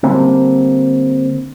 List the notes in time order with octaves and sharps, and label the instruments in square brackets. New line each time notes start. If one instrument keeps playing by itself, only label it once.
[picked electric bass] D3 G3 A#3 C4